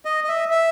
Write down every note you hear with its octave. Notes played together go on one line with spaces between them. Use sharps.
D#5
D#5
E5
E5